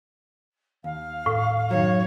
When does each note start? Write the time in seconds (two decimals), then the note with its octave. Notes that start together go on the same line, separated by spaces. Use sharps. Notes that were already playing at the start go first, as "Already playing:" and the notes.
0.84 D#2 F5
1.26 A2
1.71 F#2 D#3 F#3 C#5